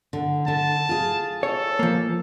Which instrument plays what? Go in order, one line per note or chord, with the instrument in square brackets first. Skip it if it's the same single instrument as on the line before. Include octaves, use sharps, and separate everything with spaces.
[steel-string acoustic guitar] D3
[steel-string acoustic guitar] D3 [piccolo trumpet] A5
[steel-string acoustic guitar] F4 G#4
[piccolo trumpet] A4 [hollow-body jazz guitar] C#5
[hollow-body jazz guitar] F3 A#3